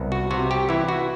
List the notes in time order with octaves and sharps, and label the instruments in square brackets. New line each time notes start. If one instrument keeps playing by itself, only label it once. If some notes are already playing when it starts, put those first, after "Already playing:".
Already playing: [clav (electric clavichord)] C2 B3
F#4
C3 F#4
G4
E3 E4
F#4